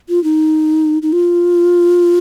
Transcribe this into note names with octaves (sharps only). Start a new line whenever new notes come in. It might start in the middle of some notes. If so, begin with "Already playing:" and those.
F4
D#4
D#4
F4